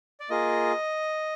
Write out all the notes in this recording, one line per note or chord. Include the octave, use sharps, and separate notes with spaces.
D5
A#3 F4 G#4 D#5